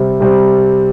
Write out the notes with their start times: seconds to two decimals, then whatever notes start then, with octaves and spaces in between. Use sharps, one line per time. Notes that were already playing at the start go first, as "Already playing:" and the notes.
Already playing: C3 G3 C4
0.20 C3 G3 C4